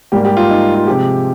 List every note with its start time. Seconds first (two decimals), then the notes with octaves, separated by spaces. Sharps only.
0.12 G#2 G3 A#3 G4
0.25 G4
0.37 F4
0.50 D#4
0.75 F4
0.87 C3 F3 G#3 G4